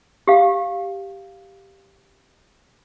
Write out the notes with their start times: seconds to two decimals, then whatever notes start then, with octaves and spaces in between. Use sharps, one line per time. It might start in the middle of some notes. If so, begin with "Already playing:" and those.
0.27 G4 F5